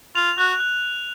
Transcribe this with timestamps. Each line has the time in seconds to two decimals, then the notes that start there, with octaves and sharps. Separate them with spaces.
0.15 F4 F7
0.38 F#4 F#6
0.60 F#6